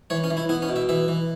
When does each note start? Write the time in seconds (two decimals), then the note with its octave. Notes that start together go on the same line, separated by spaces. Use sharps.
0.10 E3 C#5
0.24 C#4
0.31 E3
0.37 E4
0.49 B3 E4
0.62 C#4
0.69 B2
0.76 E5
0.89 E3 E5
1.08 E3